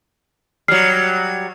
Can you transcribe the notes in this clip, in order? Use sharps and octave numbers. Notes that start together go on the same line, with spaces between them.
F#3 G3 F6 C7